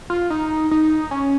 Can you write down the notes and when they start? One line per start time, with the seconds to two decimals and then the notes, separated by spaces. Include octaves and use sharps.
0.10 F4
0.30 D#4
0.71 D#4
1.11 C#4